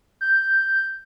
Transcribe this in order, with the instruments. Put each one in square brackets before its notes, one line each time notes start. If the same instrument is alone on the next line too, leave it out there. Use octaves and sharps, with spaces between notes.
[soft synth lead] G6